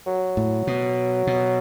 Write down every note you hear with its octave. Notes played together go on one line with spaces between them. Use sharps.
F#3
A2
B2
B2